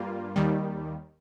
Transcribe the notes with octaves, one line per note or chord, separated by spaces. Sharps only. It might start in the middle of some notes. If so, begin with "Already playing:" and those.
Already playing: G2 G3 A#3 F4
D#2 D#3 G3